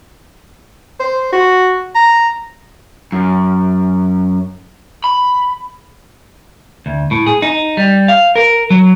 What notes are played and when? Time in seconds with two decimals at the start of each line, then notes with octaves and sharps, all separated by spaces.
1.00 C5
1.32 F#4
1.95 A#5
3.12 F#2
5.04 B5
6.86 D2
7.11 A2
7.26 G#4
7.42 D#4
7.77 G3
8.08 F5
8.36 A#4
8.70 F#3